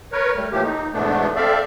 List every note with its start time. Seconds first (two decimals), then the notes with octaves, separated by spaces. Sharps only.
0.12 A#4 B4 C#5
0.36 G3 A3
0.52 A2 E3 F3 A3 A#3 G4
0.64 D#4
0.93 E2 G#2 B2 A3 B3 D4
1.36 C4 A4 D5 E5 F5